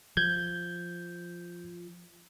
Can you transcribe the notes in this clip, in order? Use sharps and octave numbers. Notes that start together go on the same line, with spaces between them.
F3 G6 G#6